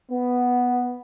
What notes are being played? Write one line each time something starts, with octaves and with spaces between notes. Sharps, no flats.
B3